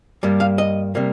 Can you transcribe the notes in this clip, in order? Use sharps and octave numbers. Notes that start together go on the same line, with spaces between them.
G2 G3 A#3
F5
D#5
C3 G3 A#3